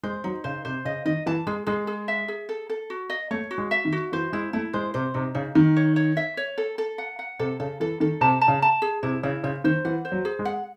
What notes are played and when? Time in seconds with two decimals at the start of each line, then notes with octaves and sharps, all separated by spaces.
0.03 G#3 C5
0.24 F#3 D#4
0.44 C#3 C5
0.65 C3 C5
0.85 C#3 D#5
1.05 D#3 D#5
1.26 E3 A5
1.47 G#3 G#4
1.67 G#3 G#4
1.87 G#4
2.08 E5
2.28 G#4
2.49 A4
2.70 A4
2.90 F#4
3.10 D#5
3.31 A3 C#5
3.51 F#4
3.58 G#3
3.71 E5
3.85 D#3
3.93 F#4
4.12 E3 C5
4.33 G#3 E4
4.53 A3 E4
4.73 G#3 C5
4.94 C3 C5
5.14 C3 D#4
5.35 C#3 D#4
5.55 D#3 D#4
5.76 C#5
5.96 C#5
6.17 E5
6.37 C#5
6.58 A4
6.78 A4
6.98 F#5
7.19 F#5
7.39 C3 A4
7.60 C#3 A4
7.80 E3 A4
8.00 D#3 A4
8.21 C3 A5
8.41 A5
8.48 C#3
8.62 A5
8.82 G#4
9.03 C3 E4
9.23 C#3 E4
9.44 C#3 C5
9.64 D#3 C5
9.85 E3 F#5
10.05 C5
10.12 F#3
10.25 G#4
10.39 G#3
10.45 F#5